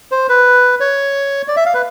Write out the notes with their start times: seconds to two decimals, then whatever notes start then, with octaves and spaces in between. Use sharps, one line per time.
0.12 C5
0.29 B4
0.80 C#5
1.48 D5
1.57 E5
1.66 F5
1.74 B4